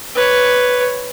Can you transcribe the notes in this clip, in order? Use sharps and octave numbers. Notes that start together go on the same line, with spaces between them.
B4 C#5